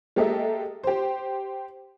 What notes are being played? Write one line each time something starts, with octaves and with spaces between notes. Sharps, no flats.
G#3 A#3 G4 A4 D#5 E5
G4 C5